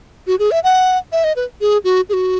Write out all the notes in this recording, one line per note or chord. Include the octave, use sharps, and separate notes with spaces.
F#4
G#4
E5
F#5
E5
D#5
B4
G#4
F#4
G#4
F#4